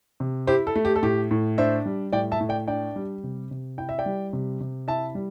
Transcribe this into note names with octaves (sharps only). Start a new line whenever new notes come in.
C3
E4 G4 C5
A4
A3
G4
A4
A2 G4
A2
D4 C5 E5
G3
A2 D5 G5
E5 A5
A2
D5 G5
D4 D5 G5
G3
C3
C3
E4 G5
E5
D5 G5
G3
C3
C3
E4 E5 A5
G3